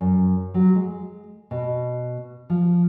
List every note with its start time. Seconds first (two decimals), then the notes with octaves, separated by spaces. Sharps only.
0.01 F#2
0.54 F#3
0.75 G#3
1.51 B2
2.50 F3